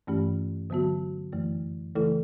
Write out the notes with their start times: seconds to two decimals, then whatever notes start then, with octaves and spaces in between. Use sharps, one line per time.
0.07 G2 E3 A3 C#4 G4
0.70 D3 F#3 B3 F#4
1.33 F#2 E3 A3
1.95 C#3 E3 A3 E4 A4